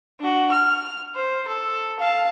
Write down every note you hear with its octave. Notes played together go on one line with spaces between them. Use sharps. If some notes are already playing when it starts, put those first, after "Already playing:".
D4 F#4
F6
C5
A4
F5 A5